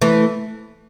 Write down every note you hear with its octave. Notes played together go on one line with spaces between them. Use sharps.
E3 A3